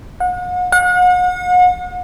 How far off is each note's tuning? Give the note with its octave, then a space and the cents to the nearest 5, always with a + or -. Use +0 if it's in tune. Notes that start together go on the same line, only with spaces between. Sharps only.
F#5 -40
F#5 -40